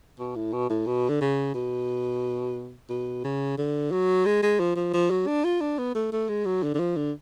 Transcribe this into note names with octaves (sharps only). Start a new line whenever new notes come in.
B2
A2
B2
A2
B2
D3
C#3
B2
B2
C#3
D3
F#3
G#3
G#3
F3
F3
F3
F#3
D4
F4
D4
B3
A3
A3
G#3
F#3
D3
D3
F3
D3